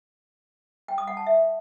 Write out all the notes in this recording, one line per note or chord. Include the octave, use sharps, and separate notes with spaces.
G5
D#6
F#5
A5
E5